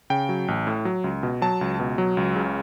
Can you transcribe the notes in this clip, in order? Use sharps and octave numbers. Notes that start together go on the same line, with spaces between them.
C#3 G5
F#3
A1
A2
F#3
C#2
B2
F#3 A5
C#2
B2
F#3
C#2
C#3